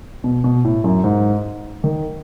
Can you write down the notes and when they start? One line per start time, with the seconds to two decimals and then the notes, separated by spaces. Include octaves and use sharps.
0.24 B2
0.44 B2
0.64 A2
0.84 F#2
1.04 G#2
1.84 D#3